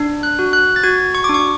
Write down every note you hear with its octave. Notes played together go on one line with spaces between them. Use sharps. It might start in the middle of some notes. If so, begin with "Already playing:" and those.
Already playing: D4
F#6
F#4
F#6
A6
F#4 G#6
C#6
D6
D4
C#6